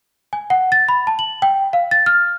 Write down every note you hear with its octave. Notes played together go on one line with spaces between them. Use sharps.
G#5
F#5
A6
B5
A5
F#7
G5
F5
A6
F6